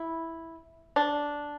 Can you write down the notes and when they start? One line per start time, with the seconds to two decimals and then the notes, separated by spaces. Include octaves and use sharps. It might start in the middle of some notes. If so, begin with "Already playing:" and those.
Already playing: E4
0.96 D4